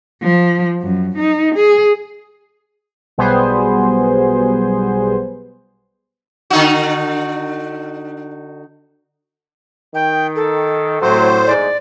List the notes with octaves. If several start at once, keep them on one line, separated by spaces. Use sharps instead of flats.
F3
F#2
D#4
G#4
B1 B2 G3 B3 G#4 C5
D3 D#4 F#4
D#3 G5
A4
A2 C3 F#3 C5
E2 G#2 D5